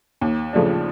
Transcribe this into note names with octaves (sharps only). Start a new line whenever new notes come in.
D#2
C#3 F3 A3 D4